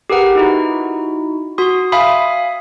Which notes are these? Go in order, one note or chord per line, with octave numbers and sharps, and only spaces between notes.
G4 G#4 A#4 B4 F#5
D#4 E4 F#4
F#4 C6 D#6
E5 F5 G#5 B5 D#6